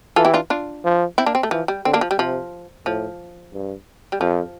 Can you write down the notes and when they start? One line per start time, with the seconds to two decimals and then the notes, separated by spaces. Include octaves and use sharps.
0.16 E3 F4 A4
0.25 E4 G4
0.34 D4 F4
0.50 D4 F4
0.84 F3
1.18 C4 E4
1.26 A#3 D4
1.35 C4
1.43 A3
1.51 E3 F3
1.68 G3
1.85 D3 C4
1.93 A#3 D4
2.01 F3
2.11 G3
2.18 C3 F3
2.86 A2 F3
3.53 G2
4.12 G3
4.21 F2 F3